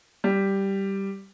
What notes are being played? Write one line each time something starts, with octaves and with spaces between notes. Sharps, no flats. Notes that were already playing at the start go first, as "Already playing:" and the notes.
G3